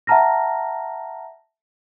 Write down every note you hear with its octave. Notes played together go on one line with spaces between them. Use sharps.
E5 F#5 A5 A#5 F6 A#6